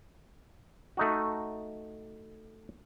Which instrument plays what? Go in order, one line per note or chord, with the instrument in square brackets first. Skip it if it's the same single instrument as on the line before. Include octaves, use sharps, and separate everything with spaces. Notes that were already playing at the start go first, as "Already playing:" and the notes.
[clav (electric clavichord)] A3 D#4 F#4